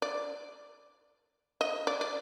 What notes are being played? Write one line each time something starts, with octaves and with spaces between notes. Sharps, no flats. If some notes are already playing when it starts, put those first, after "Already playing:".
D5
D#5
D5
D5